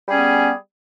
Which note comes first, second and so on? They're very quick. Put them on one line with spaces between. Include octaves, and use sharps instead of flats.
G3 G#4 C#4 B3